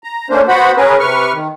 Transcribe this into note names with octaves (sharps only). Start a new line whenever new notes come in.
A#5
A3 A#3 C#4 D4 C5
B3 F#4 C5 F#5 B5
C#4 G#4 A#4 B4
C3 B4 C#6 F6
D#3